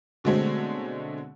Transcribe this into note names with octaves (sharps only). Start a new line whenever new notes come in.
B2 D3 F#3 G#3 A3 C4